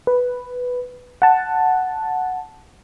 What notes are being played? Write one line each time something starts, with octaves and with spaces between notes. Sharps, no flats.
B4
F#5 A5